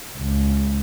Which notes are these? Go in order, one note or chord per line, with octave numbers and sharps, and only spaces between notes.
C#2